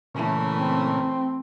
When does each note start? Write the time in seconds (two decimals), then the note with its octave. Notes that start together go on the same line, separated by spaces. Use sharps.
0.15 A#2 C#3 E3 A3
0.56 C4